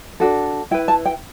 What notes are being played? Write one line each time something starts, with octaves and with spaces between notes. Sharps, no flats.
D4 F#4 A4
E4 B4 G5
A5
G5